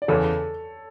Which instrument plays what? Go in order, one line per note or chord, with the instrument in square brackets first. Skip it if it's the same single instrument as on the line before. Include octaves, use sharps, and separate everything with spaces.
[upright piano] D5
[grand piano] E2 C#3 E3 [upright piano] A4 C#5